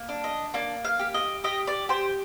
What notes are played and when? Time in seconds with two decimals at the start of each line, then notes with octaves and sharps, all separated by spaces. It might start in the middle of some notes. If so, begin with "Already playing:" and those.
Already playing: A#3
0.09 D4
0.24 D#5
0.54 A#3 D5
0.85 F5
0.99 G4
1.14 D#5
1.44 G4 D#5
1.67 D5
1.89 G4 C5